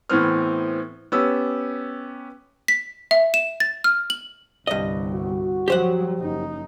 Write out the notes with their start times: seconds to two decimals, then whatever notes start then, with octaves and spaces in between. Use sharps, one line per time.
0.09 A2 E3 B3 C4 F6
1.12 B3 C#4 G4 E6
2.68 B6
3.11 E5
3.34 E7
3.60 A6
3.84 F6
4.10 F#7
4.67 G1 C2 G2 D#5
5.14 F#4
5.68 F3 F#3 G4 C5 F#5
6.19 F#1 D#4